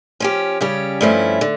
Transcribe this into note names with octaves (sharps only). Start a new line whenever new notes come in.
F3 C#4 G4
C#3 G3 C#4 G4
G2 F3 A3 C#4 E4
D3